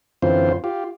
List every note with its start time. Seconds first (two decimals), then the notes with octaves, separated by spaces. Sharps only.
0.22 F#2 D3 E3 C4 F4 C5
0.64 F4 G4